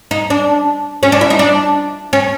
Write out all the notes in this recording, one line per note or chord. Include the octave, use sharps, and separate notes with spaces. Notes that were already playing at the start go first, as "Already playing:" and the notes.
D#4
D4
C#4
D4
E4
D#4
D4
C#4